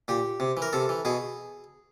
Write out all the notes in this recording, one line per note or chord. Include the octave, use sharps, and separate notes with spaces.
A#2 G4
C3
E3
A#4
C3 A4
E3
B2 G#4